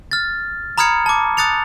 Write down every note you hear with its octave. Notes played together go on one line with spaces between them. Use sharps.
F6 A6
A#5 B5 D#6 F6 G#6 C#7
A5 D6
D#6 F#6 A6 C#7 F7